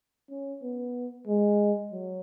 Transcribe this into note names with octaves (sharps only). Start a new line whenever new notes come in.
C#4
B3
G#3
F#3